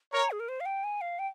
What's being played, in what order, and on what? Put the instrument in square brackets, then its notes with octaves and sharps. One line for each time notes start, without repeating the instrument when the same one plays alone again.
[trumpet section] A#4 C#5 [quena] A#5
[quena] G#4
A#4
C5
F5
G5
G#5
F5
G5